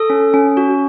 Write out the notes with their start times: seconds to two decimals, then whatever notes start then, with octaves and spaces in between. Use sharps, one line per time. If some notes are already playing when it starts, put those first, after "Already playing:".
Already playing: A4 D#6
0.10 C#4
0.34 C#4
0.57 F#4